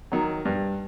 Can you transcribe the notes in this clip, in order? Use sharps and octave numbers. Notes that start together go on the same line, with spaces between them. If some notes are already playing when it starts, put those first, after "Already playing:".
D#3 F#3
G2